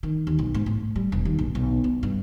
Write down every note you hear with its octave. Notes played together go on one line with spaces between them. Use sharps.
D#3
D#2
B1
G#2
A2
G3
E1
D#2
A#1
B1
B3
G2